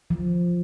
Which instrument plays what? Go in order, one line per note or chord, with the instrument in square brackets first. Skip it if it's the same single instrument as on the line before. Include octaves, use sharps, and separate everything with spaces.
[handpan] F3